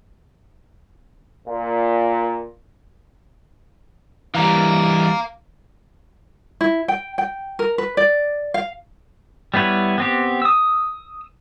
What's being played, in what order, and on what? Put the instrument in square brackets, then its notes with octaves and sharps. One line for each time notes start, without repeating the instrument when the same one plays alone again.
[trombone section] A#2
[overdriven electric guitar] E3 G3 [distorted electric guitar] F5 A#5
[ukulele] E4
G5
G5
A#4
B4
D5
F5
[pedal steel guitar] G3 B3 E4 B4 C#5
B3 C4 G4
D#6 E6